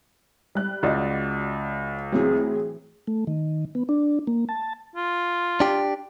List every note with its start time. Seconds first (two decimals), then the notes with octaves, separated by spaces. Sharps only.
0.55 G3 F#6
0.83 C#2 F#4 D5 D#5
2.12 A2 E3 F#3 C4 G#4
3.07 A3
3.27 D#3
3.75 B3
3.89 D4
4.27 A#3
4.49 A5
4.95 F4
5.60 D4 G4